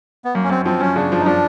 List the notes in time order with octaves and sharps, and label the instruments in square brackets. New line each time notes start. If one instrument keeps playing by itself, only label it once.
[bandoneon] B3
[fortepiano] F#2 [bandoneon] A#3
[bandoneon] C#4
[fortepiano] F#2 [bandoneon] C4
[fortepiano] F3 [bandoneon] C4
[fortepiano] F#2 [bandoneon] C#4
[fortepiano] C#3 [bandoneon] D4
[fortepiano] F3
[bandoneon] D#4
[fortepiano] F3 [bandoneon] D4